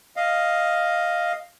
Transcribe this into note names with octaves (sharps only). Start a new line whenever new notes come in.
D#5 F5